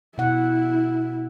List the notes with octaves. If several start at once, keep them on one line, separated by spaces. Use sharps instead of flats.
B2 E4 F#5